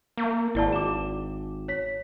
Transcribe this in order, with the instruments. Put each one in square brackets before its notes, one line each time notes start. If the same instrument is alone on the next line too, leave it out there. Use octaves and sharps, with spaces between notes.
[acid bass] A#3
[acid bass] G#1 [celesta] E4 D5 A5
[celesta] D6 E7
C#5 B6